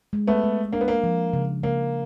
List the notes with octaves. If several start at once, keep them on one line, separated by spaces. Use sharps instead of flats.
G#3
A3 B3
G#3
A#3 D4
B3
A#3
F3
C#3
C#3 A#3